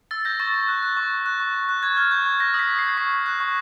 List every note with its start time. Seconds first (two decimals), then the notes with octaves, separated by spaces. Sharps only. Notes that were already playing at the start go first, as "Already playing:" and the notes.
0.11 E6 A6
0.25 G6 A#6
0.40 C#6 A6
0.54 C#6 A6
0.68 F#6
0.83 F#6
0.97 C#6
1.11 C#6
1.26 F#6
1.40 C#6
1.54 C#6
1.69 F#6
1.83 C#6 G#6
1.97 F6 G#6
2.11 C#6 G6
2.26 C#6 G#6
2.40 G6 A#6
2.54 D#6
2.59 B6
2.69 D#6
2.79 G6 C7
2.97 C#6 B6
3.11 C#6
3.26 F#6
3.40 C#6